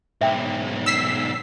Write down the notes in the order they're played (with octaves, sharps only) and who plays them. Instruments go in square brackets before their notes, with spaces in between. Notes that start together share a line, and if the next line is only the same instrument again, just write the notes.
[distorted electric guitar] B1 G#2 [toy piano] E5 G5
[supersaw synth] E6 B6 C7